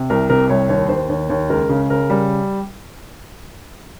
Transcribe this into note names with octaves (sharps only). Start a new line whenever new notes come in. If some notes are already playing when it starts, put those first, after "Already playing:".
Already playing: C3
C2 A#4
C3 A#4
C2 C#5
D#2 C#5
D#2 C5
D#2 C#5
D#2 C#5
C#2 A#4
C#3
C#3 A#4
G3